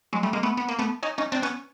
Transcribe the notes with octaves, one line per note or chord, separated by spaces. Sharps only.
F#3 G#3
G3 A3
G#3 A#3
A3 B3
B3
A#3
A3 B3
C#4 D#4
C#4 D#4
C4 D4
B3 C#4